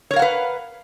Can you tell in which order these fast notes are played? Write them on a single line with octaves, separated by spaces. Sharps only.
C#5 A#4 F5 F#5 B4